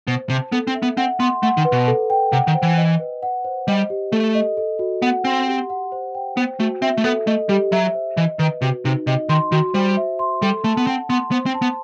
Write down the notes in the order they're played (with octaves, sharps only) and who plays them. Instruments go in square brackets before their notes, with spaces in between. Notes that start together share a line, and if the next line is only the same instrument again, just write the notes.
[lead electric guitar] B2 [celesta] C5
[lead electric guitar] C3 [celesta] A5
[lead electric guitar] B3 [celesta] A4
[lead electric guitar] C4
[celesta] E5
[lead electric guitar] B3
[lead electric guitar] C4 [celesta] F#5
[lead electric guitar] B3 [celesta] C6
[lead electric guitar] A3 [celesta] F#5
[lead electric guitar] D#3
[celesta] B4
[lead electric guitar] B2
[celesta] A4
G5
[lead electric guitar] C3 [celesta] F#5
[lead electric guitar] D#3
[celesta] C5
[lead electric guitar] E3
[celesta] D#5
B4
F#5
C5
[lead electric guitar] G3 [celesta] D#5
[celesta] G4
[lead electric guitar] A3 [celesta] A4
[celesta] D#5
A4
F#4
[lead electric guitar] B3 [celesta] F#5
[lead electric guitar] C4 [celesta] C6
[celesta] G4
F#5
C5
G5
[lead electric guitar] B3 [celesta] C5
[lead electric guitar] A3 [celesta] F#4
[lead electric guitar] C4 [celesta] E5
[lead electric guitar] A3
[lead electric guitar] B3 [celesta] A4
[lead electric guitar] A3 [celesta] D#5
[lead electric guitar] G3 [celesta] G4
[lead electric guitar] F#3 [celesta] E5
[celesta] C5
[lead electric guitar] E3 [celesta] D#5
[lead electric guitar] D#3 [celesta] B4
[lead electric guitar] C3 [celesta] F#4
[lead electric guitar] C3 [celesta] D#4
[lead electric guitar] C3 [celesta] D#5
[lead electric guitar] D#3 [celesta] C6
[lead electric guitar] D#3 [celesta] F#4
[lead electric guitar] G3 [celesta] C5
[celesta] E5
C6
[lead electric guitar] G3 [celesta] A4
[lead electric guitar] A3 [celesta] A5
[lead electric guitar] B3
[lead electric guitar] C4 [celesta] F#5
[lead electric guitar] B3 [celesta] C6
[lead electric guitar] B3 [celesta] C5
[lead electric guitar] C4
[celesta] A5
[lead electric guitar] B3